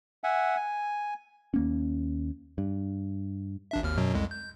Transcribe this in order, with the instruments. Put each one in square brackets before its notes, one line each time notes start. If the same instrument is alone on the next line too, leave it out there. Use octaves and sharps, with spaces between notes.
[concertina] E5 F#5 G#5
G#5
[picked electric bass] D#2 A#3 C#4
G2
[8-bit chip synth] A1 D4 E5
G#1 D#2 F6
F#2 B2 F#3
C2 F2 G#3
G6